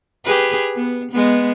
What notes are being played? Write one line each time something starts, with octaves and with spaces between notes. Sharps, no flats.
G4 G#4 B4
B3
G#3 B3